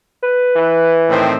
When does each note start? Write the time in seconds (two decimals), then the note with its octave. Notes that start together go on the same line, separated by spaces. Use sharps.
0.23 B4
0.56 E3
1.09 A2 D#3 C4